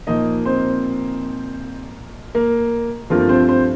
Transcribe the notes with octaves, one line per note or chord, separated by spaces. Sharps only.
A#2 F3 A#3 D#4 D#5
C4 C5
A#3 A#4
G2 F3 A3 A#3 C4 F4 A#4
C4 C5
C4 C5